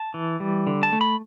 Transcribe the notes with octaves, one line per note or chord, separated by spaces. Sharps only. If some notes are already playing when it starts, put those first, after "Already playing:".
Already playing: A5
E3
G3
D3
A5
A3
B5